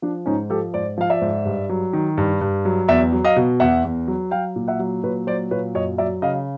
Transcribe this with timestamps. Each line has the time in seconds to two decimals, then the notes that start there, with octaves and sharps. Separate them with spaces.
0.02 F3 D4
0.26 G#2 C#4 D#4
0.50 F3 G4 A4
0.74 G#2 C5 D5
0.98 F3 F5
1.10 D5 E5
1.21 G#2
1.45 G2
1.69 F#3
1.93 D#3
2.18 G2
2.41 G2
2.65 F#3
2.88 E2 D5 E5
3.12 F#3
3.25 D#5 F5
3.36 B2
3.60 E2 E5 F#5
3.85 E2
4.08 F#3
4.31 F#3 F5 G5
4.56 A#2
4.68 E5 F#5
4.79 F#3
5.03 A#2 B4 C#5
5.27 F#3 C5 D5
5.51 A#2 B4 C#5
5.75 F#2 C#5 D#5
5.98 F#3 D5 E5
6.22 C#3 D#5 F5